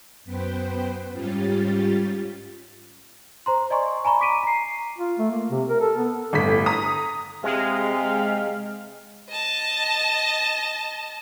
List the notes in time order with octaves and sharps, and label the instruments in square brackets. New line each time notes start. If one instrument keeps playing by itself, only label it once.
[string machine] F#2 B3 B4 C5 G5
G#2 G3 C#4 F4 G4 A6
[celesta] C5 A#5 C6
D5 D#5 G#5 C6 C#6
G#5 A#5 B5 C#6
D6 B6 D7 D#7
A#5 C7
[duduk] F4
A3
A#3
C3
A#4
A4
B3
[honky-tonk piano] G1 A2 B6
A#5 D#6
[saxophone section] C3 F5 [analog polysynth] G#3
[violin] D#5 A5